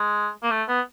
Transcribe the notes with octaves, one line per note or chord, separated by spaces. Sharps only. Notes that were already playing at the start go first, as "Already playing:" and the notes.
Already playing: G#3
A#3
A3
B3